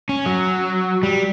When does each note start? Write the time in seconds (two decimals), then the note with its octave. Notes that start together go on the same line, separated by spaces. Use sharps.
0.09 C#4
0.26 F#3
1.03 G3